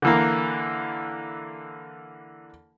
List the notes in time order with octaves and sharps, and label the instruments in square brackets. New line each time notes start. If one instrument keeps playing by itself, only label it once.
[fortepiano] D3 E3 A#3